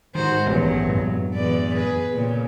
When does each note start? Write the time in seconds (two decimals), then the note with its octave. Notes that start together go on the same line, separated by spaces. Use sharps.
0.15 G#2 D#3 F#4 C5
0.46 A1 E2 G2 D#3 F#3
0.89 F#2 A2 E3
1.34 E2 B4 D5
1.75 G#4 B4
2.13 A#2 C#3